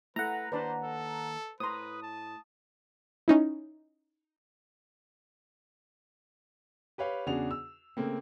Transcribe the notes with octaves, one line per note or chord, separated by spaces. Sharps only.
A3 E4 A4 B4 F#5 A#5
D#2 D4 B4 C5 D5 A5
A4
A2 B4 C5 A#5 C6 D#6
A5
C#4 D#4 E4
G4 B4 C#5 F5 G5
E2 C#3 D4 F#4 G#4 F7
E6
C#3 A3 A#3 C4